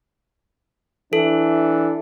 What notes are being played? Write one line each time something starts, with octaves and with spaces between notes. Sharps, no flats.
E3 D4 A4